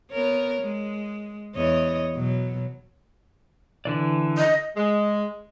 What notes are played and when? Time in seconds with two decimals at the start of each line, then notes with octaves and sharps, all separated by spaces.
0.12 B3 A#4 C#5
0.62 G#3
1.56 E2 C#5 D#5
2.16 B2 F#3
3.85 D3 E3 D5
4.38 D#5
4.77 G#3